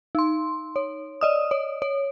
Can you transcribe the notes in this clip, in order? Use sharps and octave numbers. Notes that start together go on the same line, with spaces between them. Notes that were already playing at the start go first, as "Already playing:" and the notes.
D#4 C6
C#5
D5 D#5 D#6
C#5
C#5